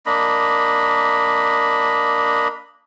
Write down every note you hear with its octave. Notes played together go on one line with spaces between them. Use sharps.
A#3 D4 D#5 B5